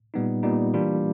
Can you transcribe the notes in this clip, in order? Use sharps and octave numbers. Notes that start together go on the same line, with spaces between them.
A#2 G3 B3 D#4
A#2 G3 B3 D#4
E3 G3 A#3 D4 F4